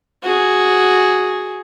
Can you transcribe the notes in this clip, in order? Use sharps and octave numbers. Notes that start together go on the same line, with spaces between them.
F#4 G#4